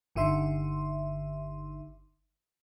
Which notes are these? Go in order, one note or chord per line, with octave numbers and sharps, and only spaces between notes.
G1 D3 D#4 E5 C6